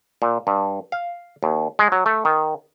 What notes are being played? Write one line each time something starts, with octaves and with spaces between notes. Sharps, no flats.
A#2
G2
F5
D#2
G#3
F#3
A3
D#3